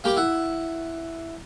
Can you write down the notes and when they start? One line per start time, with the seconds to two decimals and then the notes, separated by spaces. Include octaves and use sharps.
0.04 A#3 G4 B5 D6
0.17 E4 F#5